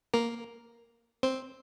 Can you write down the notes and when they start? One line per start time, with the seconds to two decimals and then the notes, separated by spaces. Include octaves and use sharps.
0.14 A#3 A#4
1.23 C4 C5